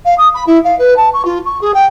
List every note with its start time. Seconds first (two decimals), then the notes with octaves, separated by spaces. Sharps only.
0.05 F5
0.17 D#6
0.34 B5
0.46 E4
0.64 F5
0.78 B4
0.96 A5
1.13 C#6
1.25 F4
1.45 C#6
1.61 G#4
1.74 G5